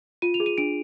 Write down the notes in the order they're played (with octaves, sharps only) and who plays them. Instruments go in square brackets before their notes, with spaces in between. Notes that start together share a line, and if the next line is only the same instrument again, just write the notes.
[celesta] F4 D#7
F7
G#4
D#7
D4 D7